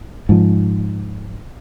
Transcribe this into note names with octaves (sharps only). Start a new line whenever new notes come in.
G#2 F3